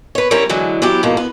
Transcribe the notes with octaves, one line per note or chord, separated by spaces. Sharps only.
B4 C#5
G3 C4 C#4 E4 A#4 C#5
D3 E3 F#3 G#3
F#3 B3 E4 G4
F2 G#2 B2 A#3
B3